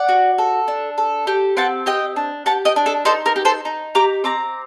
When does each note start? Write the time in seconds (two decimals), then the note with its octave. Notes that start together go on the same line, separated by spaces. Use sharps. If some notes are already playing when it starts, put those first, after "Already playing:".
Already playing: D5 F#5
0.09 F#4
0.38 A4
0.68 D4
0.98 A4
1.27 G4
1.57 C4 F#5 A5
1.86 G4 D#5 G5
2.16 D4
2.46 G4 F#5 A5
2.65 D#5 G5
2.76 D4
2.86 A4
3.05 D#4 A4 C5
3.26 A#4
3.36 G4
3.45 A4 C5
3.65 D#4
3.95 G4 A#5 D6
4.24 C4 A#5 D6